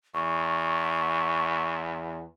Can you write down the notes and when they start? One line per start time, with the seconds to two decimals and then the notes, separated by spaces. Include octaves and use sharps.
0.14 E2 C#6